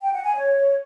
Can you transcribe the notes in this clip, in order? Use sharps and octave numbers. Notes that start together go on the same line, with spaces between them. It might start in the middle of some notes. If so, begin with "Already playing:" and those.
G5
F#5
G#5
C#5